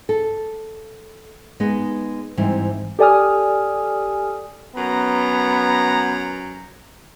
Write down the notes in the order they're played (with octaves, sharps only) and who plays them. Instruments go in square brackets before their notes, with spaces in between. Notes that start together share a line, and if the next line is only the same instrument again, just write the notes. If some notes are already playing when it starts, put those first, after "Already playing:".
[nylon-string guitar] A4
G#3 B3 D#4
G#2 E3 G3 C4
[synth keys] G4 A4 D5 G#5 D#6 F6
[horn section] F#2 A#5 [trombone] B3